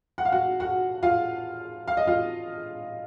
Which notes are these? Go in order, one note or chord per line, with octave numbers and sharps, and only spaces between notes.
F#5
F5
F#4 F#5
F#4 F#5
F4 F5
F5
D#5
F4 F5